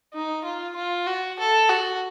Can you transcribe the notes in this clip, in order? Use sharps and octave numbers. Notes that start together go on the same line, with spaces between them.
D#4
F4
F4
F#4
A4
F#4